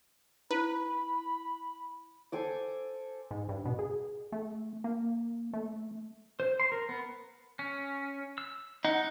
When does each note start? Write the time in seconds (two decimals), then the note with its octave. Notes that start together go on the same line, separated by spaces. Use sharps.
0.51 E4 B4 B5
2.32 A4 C5 G#5 D6
3.31 G#2
3.49 G2
3.65 B2
3.79 G#4
4.32 A3
4.84 A#3
5.54 A3
6.40 C5
6.60 C6
6.72 A#4
6.89 B3
7.59 C#4
8.38 E6
8.85 D#4 F#5